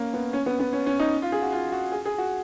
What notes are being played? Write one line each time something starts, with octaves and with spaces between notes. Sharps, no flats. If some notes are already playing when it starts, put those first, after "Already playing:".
Already playing: A#3 C#4
B3
C#4
B3
B3
C#4
C#4
D#4
F4
G#4
F#4
F4
F#4
G#4
G#4
F#4